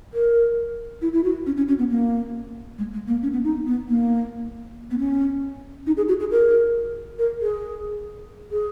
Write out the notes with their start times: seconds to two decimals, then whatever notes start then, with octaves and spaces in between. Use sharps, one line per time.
0.14 A#4
1.02 E4
1.13 E4
1.24 F#4
1.46 C#4
1.57 C#4
1.68 C#4
1.79 B3
1.90 A#3
2.78 G#3
2.93 G#3
3.07 A#3
3.23 C#4
3.33 B3
3.44 D#4
3.67 B3
3.89 A#3
4.91 B3
4.98 C#4
5.87 D#4
5.97 G#4
6.08 F#4
6.20 G#4
6.31 A#4
7.19 A#4
7.42 G#4
8.51 G#4